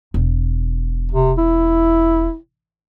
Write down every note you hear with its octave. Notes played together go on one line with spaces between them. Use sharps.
E1
C3
E4